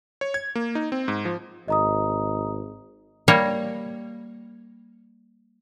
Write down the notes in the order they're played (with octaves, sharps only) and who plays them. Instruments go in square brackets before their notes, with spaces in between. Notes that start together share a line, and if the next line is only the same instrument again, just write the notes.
[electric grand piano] C#5
G#6
A#3
D#4
C4
G#2
F3
[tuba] G#1 [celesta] D#5 A#5 D#6
[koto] G3 A#3 C#5